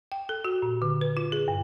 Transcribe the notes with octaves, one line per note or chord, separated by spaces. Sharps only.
G5
A4
F#4
A#2
D3
B4
F4
G#4
G2